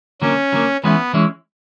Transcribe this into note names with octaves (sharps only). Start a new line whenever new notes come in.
D3 F#3 A#3 C#4
D3 F#3 A#3
E3 G#3 B3 C#4 E4
E3 G#3 C#4 E4